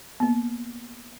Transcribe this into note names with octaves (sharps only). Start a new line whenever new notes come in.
A#3 B3